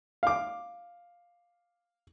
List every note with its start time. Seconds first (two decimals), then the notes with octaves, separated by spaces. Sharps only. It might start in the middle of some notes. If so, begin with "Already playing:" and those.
0.23 F5 D6